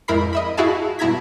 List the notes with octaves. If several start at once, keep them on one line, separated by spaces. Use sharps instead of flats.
F2 G#2 E4 A#4 B5 C7
D#5 E5 B5
E4 F#4 G#4 F5 A5
G2 B2 E4 A#5 G#6 B6